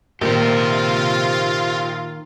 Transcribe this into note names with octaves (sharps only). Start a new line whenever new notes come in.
A#1 D#3 A#3 F4 G4 C5